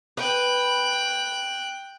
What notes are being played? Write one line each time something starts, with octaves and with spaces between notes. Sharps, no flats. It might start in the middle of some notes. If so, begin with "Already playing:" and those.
B4 G5 F#6